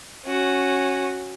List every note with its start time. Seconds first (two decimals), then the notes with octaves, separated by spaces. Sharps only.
0.25 C#4 F#4